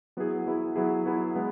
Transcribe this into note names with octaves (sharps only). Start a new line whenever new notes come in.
F#3 B3 E4 G#4
F#3 B3 E4 G#4
F#3 B3 E4 G#4
F#3 B3 E4 G#4
G#3 B3